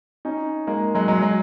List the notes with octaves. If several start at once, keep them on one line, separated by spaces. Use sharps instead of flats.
C#4 D#4
G#3 A#3
F#3 G#3
F#3 G#3
F#3 G#3